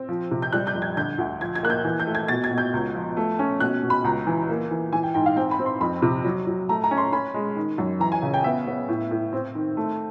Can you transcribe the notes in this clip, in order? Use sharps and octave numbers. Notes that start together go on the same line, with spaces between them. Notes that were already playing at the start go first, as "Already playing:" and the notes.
Already playing: C4
F3
C3
G6
G3 F#6
G6
F2
G#6
D3 G6
D2
F3 G#6
G#6
A#3 F#6
G6
E3
G6
A3
G#6
B2 A6
G#6
B2
G6
C#2
F3
A3
C#4
B2 F#6
B2
B5
C#2 A#5
E3
A#3
E3
E3 G#5
G5
G#2 G5
F5
C4 G5
B5
C4
C6
F2 B5
C3
F#3
F#3
A3 A#5
A#5
C#4
C6
C#4 B5
G#3
D#3
F#2
E3 A#5
G#5
C#3
G5
B3 E5
B3
A2
A2
C4
D#3
A3